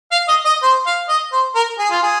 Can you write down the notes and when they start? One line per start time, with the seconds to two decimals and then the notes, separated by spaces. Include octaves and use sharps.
0.12 F5
0.28 D#5
0.45 D#5
0.63 C5
0.86 F5
1.09 D#5
1.33 C5
1.55 A#4
1.79 G#4
1.91 F4
2.03 G#4